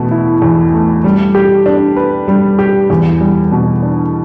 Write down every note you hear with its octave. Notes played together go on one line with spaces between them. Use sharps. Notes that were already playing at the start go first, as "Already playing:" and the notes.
Already playing: E2 B2 A3
E4
E2
A3
G3
G4
D4
B4
G3
G4
E2
G3
B2
D4